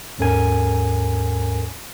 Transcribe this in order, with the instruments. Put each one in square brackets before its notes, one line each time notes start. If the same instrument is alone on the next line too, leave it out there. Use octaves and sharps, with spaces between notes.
[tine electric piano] D#2 G#2 C#4 A4 A#4 G#5